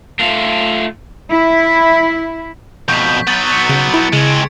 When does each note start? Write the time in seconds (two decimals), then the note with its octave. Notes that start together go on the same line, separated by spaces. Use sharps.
0.19 A3 F4
1.31 E4
2.88 F2 B2 C#6 G6 B6
3.27 F#3 B3 A6
3.48 A6 B6 C#7
3.69 C#3 D7
3.94 E4
4.13 C#3 G#3 C4 G#6 D7